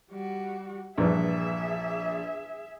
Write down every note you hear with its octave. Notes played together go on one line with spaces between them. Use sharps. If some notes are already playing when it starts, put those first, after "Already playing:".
G3 F#4
A#1 G2 A#2 E3 G#4 E5